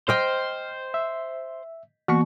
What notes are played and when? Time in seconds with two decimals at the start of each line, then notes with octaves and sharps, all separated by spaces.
0.09 C5 D#5 G5 F6
0.94 E5
2.08 E3 A#3 B3 F#4 C#6